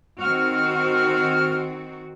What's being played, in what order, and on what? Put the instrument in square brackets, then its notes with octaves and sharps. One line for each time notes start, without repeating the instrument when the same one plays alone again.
[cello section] D#3 C4 F#4 [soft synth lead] F6